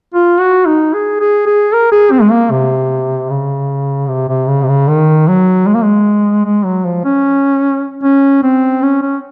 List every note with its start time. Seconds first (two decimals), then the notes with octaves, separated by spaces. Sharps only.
0.14 F4
0.40 F#4
0.67 D#4
0.94 G#4
1.20 G#4
1.46 G#4
1.73 A#4
1.92 G#4
2.12 C4
2.22 G#3
2.31 A#3
2.51 C3
3.30 C#3
4.09 C3
4.29 C3
4.48 C#3
4.63 C3
4.68 C#3
4.89 D#3
5.28 F#3
5.67 G#3
5.75 A#3
5.83 G#3
6.45 G#3
6.65 F#3
6.85 F3
7.05 C#4
8.04 C#4
8.43 C4
8.82 C#4
9.02 C#4